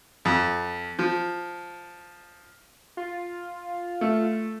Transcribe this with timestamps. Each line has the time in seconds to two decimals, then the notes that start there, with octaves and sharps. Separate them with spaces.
0.25 F2
0.99 F3
2.97 F4
4.01 A3